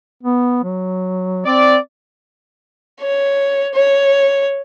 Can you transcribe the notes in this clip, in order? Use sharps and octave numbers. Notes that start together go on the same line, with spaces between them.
B3
F#3
C4 D5
C#5
C#5